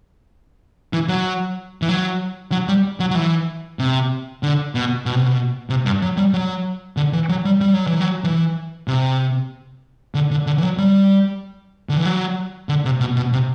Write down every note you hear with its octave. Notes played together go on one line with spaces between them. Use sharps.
E3
F#3
E3
F#3
F#3
G3
F#3
F#3
E3
C3
D3
B2
B2
C3
B2
C3
G2
F#3
G3
F#3
D3
E3
F#3
G3
G3
F#3
E3
F#3
E3
C3
D3
D3
D3
E3
F#3
G3
D3
E3
F#3
D3
C3
B2
B2
C3